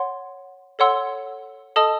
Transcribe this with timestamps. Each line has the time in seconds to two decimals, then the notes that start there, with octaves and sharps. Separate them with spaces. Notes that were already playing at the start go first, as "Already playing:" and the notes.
Already playing: C#5 F#5 C6
0.79 A4 C#5 F#5 C6 E6
1.76 A4 D#5 A5 D#6